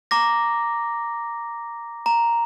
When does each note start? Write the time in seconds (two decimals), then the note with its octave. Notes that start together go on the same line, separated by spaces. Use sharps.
0.11 A#5 D6 A#6
2.06 A#5